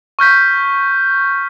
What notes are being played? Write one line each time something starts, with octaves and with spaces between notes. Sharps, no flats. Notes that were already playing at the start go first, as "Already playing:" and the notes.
C#6 F6 G6 B6